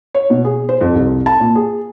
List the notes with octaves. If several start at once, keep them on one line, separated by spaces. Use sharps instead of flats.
C#5
B2
G#4
C5
F2
C2
A5
A#2
G#4